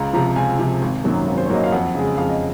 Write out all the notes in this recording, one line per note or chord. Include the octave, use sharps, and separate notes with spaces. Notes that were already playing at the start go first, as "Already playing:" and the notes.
Already playing: C#2 A#5
C3 F3 A#5
C#2 G#5
C3 F3
G#1
F#2 D#3 F#3 A#3
G#1
C5
C#5
F#2 D#3 F#3 A#3 D#5
F5
F2 F#5
C#3 G#3
F2 F5
D#5